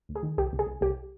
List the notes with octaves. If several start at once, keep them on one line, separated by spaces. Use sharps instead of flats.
D2
G#4
D#3
C2 G4
C2
G#4
C2
C2 G4